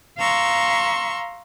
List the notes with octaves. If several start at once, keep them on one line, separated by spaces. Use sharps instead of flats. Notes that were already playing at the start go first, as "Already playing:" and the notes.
F5 A#5 C6 C#6 E6